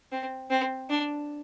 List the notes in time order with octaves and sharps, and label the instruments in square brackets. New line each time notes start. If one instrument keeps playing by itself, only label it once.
[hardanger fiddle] C4
C4
D4